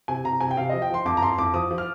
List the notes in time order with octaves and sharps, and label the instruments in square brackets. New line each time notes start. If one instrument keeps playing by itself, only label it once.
[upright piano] C3 G#5
C3 A#5
C3 G#5
G5
C3 F5
F3 D#5
G5
F3 C6
F2 D6
A#5
F2 C6
F2 D6
F3 D#6
F3
F6